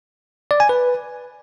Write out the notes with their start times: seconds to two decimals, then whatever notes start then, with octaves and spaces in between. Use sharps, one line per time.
0.51 D5
0.60 G#5
0.69 B4